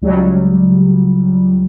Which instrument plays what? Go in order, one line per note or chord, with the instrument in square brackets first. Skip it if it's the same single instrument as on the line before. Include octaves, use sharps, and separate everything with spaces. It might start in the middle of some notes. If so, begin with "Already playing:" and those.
[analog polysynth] C#2 F#3 G3